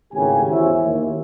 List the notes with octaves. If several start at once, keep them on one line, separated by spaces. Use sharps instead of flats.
G#1 A2 C#3 G4 G#5
E2 E4 F#4 C5 C#5 E5
D#2